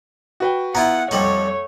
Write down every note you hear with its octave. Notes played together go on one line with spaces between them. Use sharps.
F#4 B4 G5
B3 E4 F4 F#5 A#5
F2 G3 A3 D#4 C#5 F#7